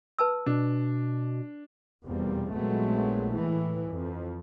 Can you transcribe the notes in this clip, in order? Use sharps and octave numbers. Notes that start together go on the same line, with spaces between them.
B4 A5 E6
B2 D4
F1 E2 B2 G3 A#3 C4
A#1 F#3 G#3 A3 B3 C4
A2 E3
F2